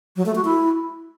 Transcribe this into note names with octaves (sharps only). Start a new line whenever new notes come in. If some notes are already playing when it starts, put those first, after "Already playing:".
F#3
A3
F#4
E4